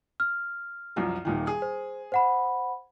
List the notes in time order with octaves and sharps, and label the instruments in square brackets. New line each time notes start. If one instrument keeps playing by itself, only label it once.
[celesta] F6
[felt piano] C2 F#2 F3
D#1 A#2 D#3
G#4
[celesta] C5
C5 F#5 B5